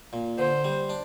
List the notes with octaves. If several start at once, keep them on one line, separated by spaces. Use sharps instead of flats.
A#2
D3 C5
G3
D4